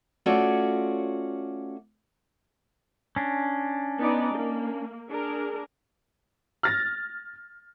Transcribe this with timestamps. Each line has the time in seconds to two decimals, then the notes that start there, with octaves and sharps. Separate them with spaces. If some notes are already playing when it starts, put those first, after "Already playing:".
0.26 A3 C#4 F4 F#4 C#5 D5
3.16 C#4 D4
4.00 B3 D#4 D5
4.35 A#3
5.10 D4 G#4 A#4
6.63 F6 A6 A#6